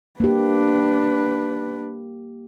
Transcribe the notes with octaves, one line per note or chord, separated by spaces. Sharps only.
A#3 D4 G4 B4